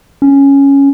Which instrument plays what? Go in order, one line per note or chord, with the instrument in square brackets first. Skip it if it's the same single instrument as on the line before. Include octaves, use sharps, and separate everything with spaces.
[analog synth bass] C#4